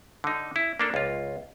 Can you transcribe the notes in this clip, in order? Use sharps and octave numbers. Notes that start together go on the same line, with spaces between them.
D3 D#4
E4
A#3 D4 A4
C#2 F4